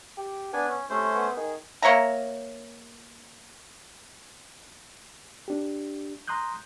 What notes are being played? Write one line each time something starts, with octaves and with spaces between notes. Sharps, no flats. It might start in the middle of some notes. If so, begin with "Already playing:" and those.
G4
B3 D4 G#5
C#4
C3 A3 C#4 C5
B3
D#3 G#4
A#3 C#5 E5 A#5
D4 G4
A#5 C6 D#6 F#6 G6